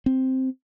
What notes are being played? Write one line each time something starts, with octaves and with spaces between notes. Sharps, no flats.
C4